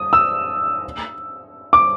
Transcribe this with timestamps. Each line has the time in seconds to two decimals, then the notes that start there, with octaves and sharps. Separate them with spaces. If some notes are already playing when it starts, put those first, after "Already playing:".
Already playing: D#6
0.13 E6
1.73 D6